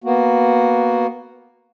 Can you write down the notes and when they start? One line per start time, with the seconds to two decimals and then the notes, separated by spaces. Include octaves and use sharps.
0.04 A#3 B3 F#4